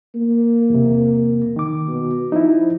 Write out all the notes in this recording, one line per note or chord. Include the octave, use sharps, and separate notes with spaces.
A#3
E2 C3
D#3 D6
B2
F3 D#4 E4